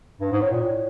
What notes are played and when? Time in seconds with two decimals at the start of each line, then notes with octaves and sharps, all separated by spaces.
0.21 G2
0.32 G#2
0.41 A2
0.52 A#2
0.61 A2